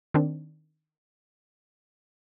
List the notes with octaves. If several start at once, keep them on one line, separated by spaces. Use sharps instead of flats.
D#3 C4 D4